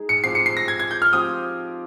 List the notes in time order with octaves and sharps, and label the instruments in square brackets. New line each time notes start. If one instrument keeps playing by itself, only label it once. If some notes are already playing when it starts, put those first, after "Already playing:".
Already playing: [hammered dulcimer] G#3 D#4 G#4
[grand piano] C#7
[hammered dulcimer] F3 C4 G4 [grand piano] C7
[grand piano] C#7
C7
A#6
G#6
G#6
G6
F6
[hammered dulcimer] F3 C4 G4 [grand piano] D#6